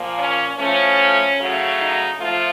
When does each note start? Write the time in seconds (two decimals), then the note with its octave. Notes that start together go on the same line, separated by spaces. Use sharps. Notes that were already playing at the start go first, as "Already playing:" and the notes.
Already playing: A#2 F3 A#3
0.18 C#4
0.58 A2 F3 A3 C#4
1.39 C#3 F#3 A3
1.80 D#4
2.20 F3 A3 F4